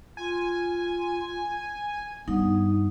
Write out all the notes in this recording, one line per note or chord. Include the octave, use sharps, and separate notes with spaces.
F4 G#5
G2 B3 D#4